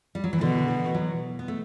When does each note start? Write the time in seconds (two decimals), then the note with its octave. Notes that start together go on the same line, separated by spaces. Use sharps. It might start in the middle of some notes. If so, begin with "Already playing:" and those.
0.15 G3
0.24 F#3
0.33 E3
0.41 B2 D3
0.68 E3
0.94 F#3
1.39 B3
1.48 A3